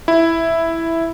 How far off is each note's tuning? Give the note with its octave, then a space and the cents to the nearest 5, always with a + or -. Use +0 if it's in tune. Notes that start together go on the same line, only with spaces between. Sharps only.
E4 +0